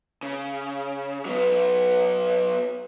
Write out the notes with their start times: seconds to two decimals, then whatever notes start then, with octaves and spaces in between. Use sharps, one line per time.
0.23 C#3
1.25 F#3 B3